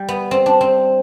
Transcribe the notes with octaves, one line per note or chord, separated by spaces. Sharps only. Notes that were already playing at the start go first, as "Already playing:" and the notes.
Already playing: G3
B3
C4
D4
C4